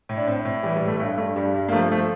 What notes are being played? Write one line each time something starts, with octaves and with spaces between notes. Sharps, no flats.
A2
D4
A2 C4
A2
E3 G3
G3
A2
A3
G2 A3
G2 A3
G2 G3
G2
A#3
F3 A3
F3 A3